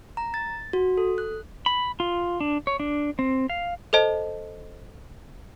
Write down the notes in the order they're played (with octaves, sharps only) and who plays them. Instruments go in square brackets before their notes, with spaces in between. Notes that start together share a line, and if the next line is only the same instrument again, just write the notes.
[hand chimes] A#5
A6
F#4
A4
F#6
[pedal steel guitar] B5
F4
D4
C#5
D4
C4
F5
[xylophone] A4 C5 D#5 A5